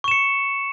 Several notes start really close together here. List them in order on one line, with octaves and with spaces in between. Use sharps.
C#6 E7 C#7